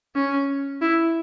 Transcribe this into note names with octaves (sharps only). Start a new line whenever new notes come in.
C#4
E4